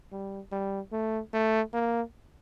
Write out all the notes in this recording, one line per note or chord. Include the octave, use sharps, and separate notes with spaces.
G3
G3
A3
A3
A#3